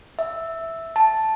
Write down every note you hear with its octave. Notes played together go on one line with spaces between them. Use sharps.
E5
A5